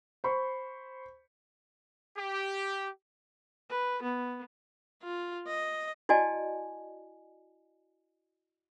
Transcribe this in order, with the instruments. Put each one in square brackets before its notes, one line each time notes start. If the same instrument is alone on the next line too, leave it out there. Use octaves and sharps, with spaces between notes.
[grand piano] C5 B5 C#6
[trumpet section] G4
[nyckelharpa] B4
B3
[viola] F4
D#5
[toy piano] E4 F#4 D5 D#5 G#5 A5